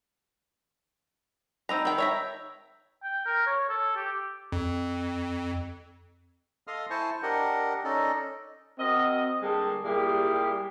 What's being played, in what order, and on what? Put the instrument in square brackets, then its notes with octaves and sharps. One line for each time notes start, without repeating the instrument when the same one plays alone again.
[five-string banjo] C4 D#4 A#5 [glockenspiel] B5 E6 G6
[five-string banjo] D#3 G5
[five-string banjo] C#5 E5 A#5 [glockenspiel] E6
[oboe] G5
A#4
C#5
A4
G4
[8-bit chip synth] F2
[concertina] A4 D#5 F5 C6 D#6 F6
E4 C5 G#5 A5 C#6
D4 G4 A#4 D#5 F#5
C#4 D#4 A4 D5 D#5
[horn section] C4 F#4 A#4 D#5
D3 G3 G#3 A#3 G4 A4
A#2 G3 G#3 A#3 E4 G4